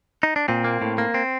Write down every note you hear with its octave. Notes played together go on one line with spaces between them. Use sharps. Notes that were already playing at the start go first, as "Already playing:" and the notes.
D#4
D4
A#2 C4
A#3
A2
A#3
C4